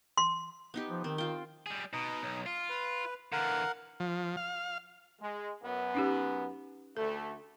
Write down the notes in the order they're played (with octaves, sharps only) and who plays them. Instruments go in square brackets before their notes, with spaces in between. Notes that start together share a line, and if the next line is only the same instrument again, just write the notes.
[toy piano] C6
[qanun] B3 D#4 G4
[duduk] F3
[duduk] D#3 [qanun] C4
[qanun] F4 G5
[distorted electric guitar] G3 G#4
[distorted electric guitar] B2 [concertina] D#4 D#5
[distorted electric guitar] B1
[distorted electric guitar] F4 [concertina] F5
[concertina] B4
[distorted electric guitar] D3 E3 [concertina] A#4 F5 F#5
[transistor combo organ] F3
F5
[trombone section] G#3
F#2 B3
[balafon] C#4 D#4 G4
[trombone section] D2 A3 [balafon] A4